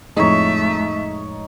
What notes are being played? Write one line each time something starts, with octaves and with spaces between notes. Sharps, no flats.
F2 A2 G#3 A3 D#4 C#5 E5